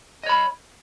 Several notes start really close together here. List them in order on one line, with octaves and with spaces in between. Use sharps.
D#5 C#5 B5